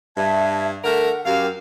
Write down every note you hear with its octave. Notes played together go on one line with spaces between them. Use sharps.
G2 E5 A5 G#6
D3 A3 A#4 F#5
F#2 G4 A#4 F5